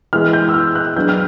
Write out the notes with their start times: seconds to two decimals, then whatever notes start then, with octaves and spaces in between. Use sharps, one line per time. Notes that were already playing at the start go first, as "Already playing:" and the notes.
0.13 E3 G#3 B3 F6
0.33 G6
0.49 E6
0.54 F6
0.75 F#6
0.96 F#3 B3 D4 G6
1.09 F6